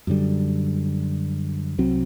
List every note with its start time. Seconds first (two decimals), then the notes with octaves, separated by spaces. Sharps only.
0.07 F#2 D3 G3
1.79 C2 C3 F#3 C4